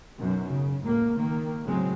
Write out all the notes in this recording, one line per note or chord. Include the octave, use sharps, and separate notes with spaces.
B1 F#2 B2
C#3
C#2 A2 A#3
D#3 A#3
A2 C#3 F#3 G#3 C4